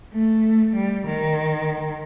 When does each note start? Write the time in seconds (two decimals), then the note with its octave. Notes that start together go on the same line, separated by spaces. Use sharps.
0.13 A3
0.75 G3
1.06 D#3